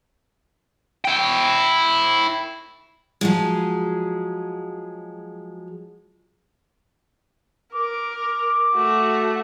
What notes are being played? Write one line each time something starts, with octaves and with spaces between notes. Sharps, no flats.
E4 G5
F3 F#3 G#3
A#4 D6
A3 F#4